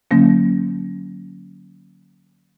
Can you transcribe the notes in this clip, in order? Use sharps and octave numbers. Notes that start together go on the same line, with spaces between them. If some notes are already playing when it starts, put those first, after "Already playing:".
D3 F#3 A#3 C#4